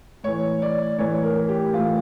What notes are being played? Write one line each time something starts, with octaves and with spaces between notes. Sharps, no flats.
A2 E3 C#5
D5
A2 E3 C#5
A#4
G4
A2 E3 F4